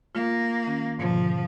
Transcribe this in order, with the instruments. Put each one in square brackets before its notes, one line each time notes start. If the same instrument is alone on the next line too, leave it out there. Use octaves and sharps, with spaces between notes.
[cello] A#3 [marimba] F4
[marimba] D#3 C#4
[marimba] G#2 B2 D3 [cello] F3